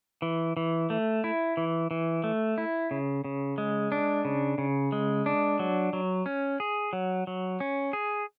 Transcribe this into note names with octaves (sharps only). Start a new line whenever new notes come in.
E3
E3
A3
E4
E3
E3
A3
E4
C#3
C#3
G#3
D4
C#3
C#3
G#3
D4
F#3
F#3
C#4
G#4
F#3
F#3
C#4
G#4